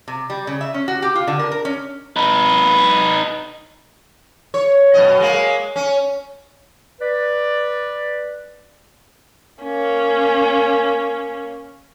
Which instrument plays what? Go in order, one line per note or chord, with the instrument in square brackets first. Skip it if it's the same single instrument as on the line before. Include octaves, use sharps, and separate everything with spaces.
[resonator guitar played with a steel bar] C3
G3
C#3
E5
C#4
F#4
G4
F4
D3
A#4
A#4
C#4
[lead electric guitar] D#4 B4
[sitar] C#5
F#2 B2 D#5
G#3 A#3
C#4
[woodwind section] B4 D5
[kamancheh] A#3 C#4